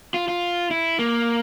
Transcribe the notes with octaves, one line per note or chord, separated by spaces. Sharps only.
F4
F4
E4
A#3